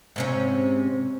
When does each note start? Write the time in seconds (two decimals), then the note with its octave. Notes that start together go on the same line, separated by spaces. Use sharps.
0.16 G#2 C3 C#4